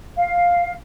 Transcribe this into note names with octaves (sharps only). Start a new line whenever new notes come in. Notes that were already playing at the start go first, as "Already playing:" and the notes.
F5